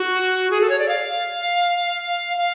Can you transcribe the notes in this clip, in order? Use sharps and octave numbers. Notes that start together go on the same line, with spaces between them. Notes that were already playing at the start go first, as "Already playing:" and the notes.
Already playing: F#4
G#4
A4
C#5
D5
F5
F5